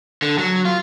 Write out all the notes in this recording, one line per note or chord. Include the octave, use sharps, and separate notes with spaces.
D3
F#3
F4